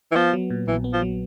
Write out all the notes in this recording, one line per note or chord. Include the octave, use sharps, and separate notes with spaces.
E3
F3 B3
F#3
A#2
A#1 E3
B3
F3
F#3